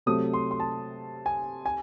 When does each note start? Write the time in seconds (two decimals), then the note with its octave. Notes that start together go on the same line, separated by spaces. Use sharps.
0.06 C3 F#3 A3 C4 D#6
0.33 C6
0.51 C6
0.60 A5
1.26 G#5
1.66 G#5